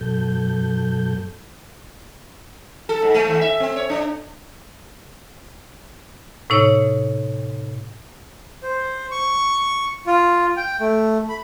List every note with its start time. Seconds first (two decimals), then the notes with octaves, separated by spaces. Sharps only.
0.01 F#2 B2 F#3 A4 G6
2.89 A4
3.02 G#2
3.14 A3
3.27 D#2
3.41 E5
3.60 C4
3.76 C#5
3.90 D4
6.50 A2 C3 D#4 C#5
8.63 C5
9.11 C#6
10.07 F4
10.57 G5
10.80 A3
11.29 B5